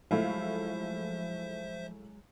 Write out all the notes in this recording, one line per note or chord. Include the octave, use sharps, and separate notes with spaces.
F3 F#3 G#3 A3 E4 C5 E5 F5